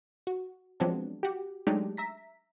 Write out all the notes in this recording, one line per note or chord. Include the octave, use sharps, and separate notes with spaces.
F#4
F3 F#3 G#3 B3 C4 D4
F#4 G4
F#3 G#3 A3 D4 D#4 G4
E5 A#5 B6